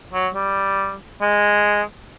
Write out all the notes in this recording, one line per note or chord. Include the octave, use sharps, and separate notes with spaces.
F#3
G3
G#3